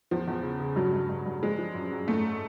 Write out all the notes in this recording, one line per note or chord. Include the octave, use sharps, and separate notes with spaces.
E2 F3
E2
C#3
C#3
G2 F#3
G2
G2
G2
F3 G#3
F3
F#2
F#2
G#2 A3